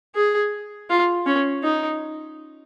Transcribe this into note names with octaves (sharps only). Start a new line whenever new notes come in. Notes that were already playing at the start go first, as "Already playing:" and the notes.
G#4
F4
C#4
D#4